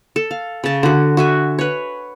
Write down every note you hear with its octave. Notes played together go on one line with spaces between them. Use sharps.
A4
F5
C#3 A5
D3 F#4
F#4 E5 G#5
B4 C#5